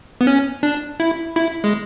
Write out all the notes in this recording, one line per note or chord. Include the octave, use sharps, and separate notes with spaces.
B3
C#4
D4
E4
E4
G#3